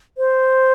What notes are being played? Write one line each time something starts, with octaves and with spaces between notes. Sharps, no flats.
C5